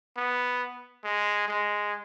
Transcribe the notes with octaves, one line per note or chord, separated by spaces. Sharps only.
B3
G#3
G#3